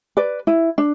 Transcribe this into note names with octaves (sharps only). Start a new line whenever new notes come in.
B4 D5
E4
D4